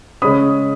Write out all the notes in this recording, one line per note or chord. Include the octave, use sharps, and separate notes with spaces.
C#3 G#3 C#4 B5 D#6